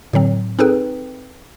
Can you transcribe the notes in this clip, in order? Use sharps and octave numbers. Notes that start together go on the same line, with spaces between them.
A2 D3 F#3 C4
C4 D#4 G#4 A4 B4 G5